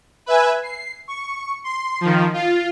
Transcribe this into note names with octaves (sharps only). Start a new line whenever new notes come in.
B4 E5 G#5
C7
C#6
C6
D#3 F3
F4